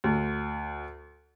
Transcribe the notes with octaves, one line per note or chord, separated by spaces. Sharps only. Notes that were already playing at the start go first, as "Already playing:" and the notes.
D2